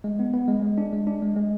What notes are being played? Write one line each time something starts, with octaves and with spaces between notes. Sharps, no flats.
G#3
B3
B3
G#3
G#3
D4
G#3
D4
G#3
G#3